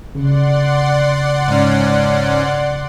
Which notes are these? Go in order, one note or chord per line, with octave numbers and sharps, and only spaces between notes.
C#3 D5 F#5 C6
G#2 C#4